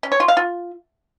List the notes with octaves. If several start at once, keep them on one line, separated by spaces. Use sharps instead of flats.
C#4
C#5
F4
F5
F4